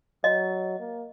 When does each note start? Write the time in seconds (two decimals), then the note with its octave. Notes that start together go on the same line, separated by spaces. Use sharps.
0.24 F#3 D#5
0.80 A#3